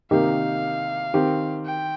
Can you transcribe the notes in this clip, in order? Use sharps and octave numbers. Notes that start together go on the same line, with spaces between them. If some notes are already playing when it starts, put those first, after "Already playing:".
C3 D#3 A#3 D#4 G4 F5
D#3 C4 G4
G5